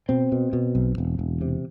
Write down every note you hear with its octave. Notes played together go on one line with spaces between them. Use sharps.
B2 C4
B2
B2
B1
E1
E1
C3